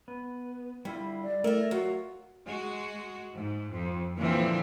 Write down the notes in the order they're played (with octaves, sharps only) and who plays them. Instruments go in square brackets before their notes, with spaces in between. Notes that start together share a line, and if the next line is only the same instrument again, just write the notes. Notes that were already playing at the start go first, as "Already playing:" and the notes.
[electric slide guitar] B3
[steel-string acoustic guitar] D3 [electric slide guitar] G3 E4 F4
[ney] D5
[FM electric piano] A3 [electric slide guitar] E4 [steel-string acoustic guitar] A#4 E5
[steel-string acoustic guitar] F#3 [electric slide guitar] F4 [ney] F#4
[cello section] G#3 F#4
G#2
F2
A#2 D3 E3 F3 G3 C4